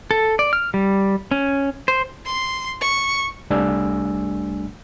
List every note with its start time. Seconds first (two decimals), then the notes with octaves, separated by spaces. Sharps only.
0.11 A4
0.39 D5
0.53 F6
0.74 G3
1.31 C#4
1.88 C5
2.25 C6
2.81 C#6
3.50 C2 G3 A3 D4 G#5 E6